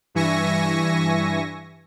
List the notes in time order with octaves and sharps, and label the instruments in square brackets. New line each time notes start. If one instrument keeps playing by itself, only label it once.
[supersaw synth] G2 E3 E5 G#5 C#6 A#6